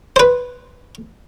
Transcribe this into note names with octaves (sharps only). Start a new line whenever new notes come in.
B4 C5